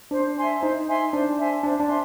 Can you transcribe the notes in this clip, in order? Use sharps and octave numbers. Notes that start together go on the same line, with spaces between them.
D4 C5
E5 G#5 C6
D#4 C5
E5 G#5 C6
D4 C5
E5 G#5 C6
D4 C5
D4
E5 G#5 C6